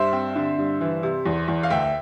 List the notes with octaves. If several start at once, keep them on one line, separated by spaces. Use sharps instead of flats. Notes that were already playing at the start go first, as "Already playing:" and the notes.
Already playing: G2 C5 E5
C4
D3
G2
E3
C3
E2
E2
F5
D2 E5 G5